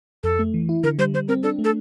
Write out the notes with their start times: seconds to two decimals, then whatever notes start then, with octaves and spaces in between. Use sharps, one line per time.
0.23 F2 A4
0.39 A3
0.54 E3
0.69 E4
0.84 D3 A#4
0.99 G3 C5
1.14 G3 C5
1.28 C4 A#4
1.43 D4 A4
1.59 A3
1.64 A4